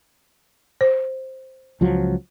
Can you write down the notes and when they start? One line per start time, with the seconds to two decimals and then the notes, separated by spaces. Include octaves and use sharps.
0.81 C5
1.81 C#2 F3 F#3